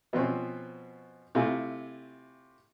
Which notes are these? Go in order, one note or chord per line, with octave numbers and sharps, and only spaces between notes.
B2 F3 C4 C#4
C3 A3 E4 F4 G#5